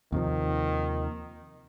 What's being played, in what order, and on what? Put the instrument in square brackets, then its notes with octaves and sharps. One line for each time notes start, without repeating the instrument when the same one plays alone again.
[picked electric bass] D#2 C3 F3 [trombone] D#3